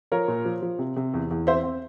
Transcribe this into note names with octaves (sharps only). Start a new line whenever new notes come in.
F3 A#4 C#5
A#2
F3
F3
C3
C3
E2
E2
C4 C5 E5
C4